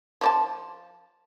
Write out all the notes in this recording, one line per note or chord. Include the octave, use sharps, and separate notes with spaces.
F3 D5 A5